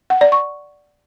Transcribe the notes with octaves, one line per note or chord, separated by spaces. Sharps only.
F#5
D5
C#6